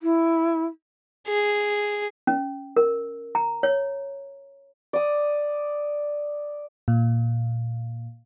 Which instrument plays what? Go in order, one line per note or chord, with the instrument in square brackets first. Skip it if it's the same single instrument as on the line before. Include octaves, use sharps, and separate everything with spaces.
[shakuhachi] E4
[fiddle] G#4
[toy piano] C#4
A#4
A#5
C#5
[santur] D5 D#6
[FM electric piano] A#2